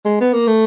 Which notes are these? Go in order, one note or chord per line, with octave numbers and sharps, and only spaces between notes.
G#3
B3
A#3
A3